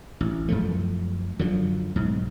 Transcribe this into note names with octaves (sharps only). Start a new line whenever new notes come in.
A1
F#2 F3 A3
F#2 D3 F3 F#3
B1 G#2